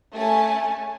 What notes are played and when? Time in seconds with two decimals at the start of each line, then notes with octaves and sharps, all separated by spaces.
0.14 A3 C#4 G#5 A5